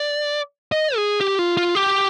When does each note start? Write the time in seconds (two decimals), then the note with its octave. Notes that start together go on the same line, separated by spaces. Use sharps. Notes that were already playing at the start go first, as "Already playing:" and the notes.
Already playing: D5
0.72 D#5
0.96 G#4
1.21 G4
1.39 F4
1.57 F4
1.75 G4